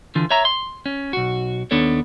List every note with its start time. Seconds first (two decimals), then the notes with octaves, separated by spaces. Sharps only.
0.15 D3 E3 F4
0.31 C#5 E5 A#5
0.45 C6
0.86 C#4
1.13 B1 F#4
1.71 D#2 B3 D4 A4 C#5